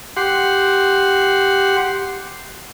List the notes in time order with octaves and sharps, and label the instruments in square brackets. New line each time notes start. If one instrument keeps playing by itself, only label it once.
[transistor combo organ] G4 F#5 C6